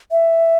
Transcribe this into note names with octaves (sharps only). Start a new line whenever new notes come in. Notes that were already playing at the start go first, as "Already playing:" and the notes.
E5